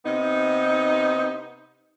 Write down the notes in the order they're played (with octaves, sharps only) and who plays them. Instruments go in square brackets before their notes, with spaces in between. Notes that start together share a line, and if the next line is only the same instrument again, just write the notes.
[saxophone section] C3 B3 D#4